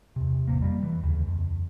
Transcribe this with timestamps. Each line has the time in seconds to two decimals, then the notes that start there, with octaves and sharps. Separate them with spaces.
0.16 E2 C3
0.48 A1 C3 A#3
0.60 F2 G3 A#3
0.83 E3
1.03 D#2 C#3
1.27 F2